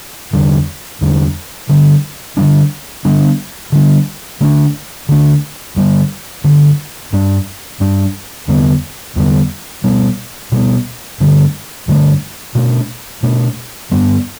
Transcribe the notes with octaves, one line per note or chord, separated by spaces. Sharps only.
E2 D3 G3 D4
E2 D3 G3 D4
D3 G3 D4
D3 G3 D4
D3 G3 B3 D4
D3 G3 B3 D4
D3 A3 D4
D3 A3 D4
G2 D3 G3
G2 D3 G3
G2 G3 D4
G2 G3 D4
E2 D3 G3 B3
E2 D3 G3 B3
B2 G3 B3
B2 G3 B3
G2 D3 A3
G2 D3 A3
B2 A3 D4
B2 A3 D4
G2 G3 B3